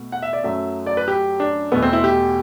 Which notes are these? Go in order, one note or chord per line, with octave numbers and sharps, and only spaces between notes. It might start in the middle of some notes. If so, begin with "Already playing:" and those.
Already playing: B2 A3
F#5
E5
D5
F#2 F#3 A3 E5
D5
B4
G4
D4
E2 B2 A3 B3
C4
E4
G4